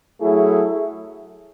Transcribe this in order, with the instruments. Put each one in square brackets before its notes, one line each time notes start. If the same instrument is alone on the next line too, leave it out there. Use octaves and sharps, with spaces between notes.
[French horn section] F#3 A3 E4 G#4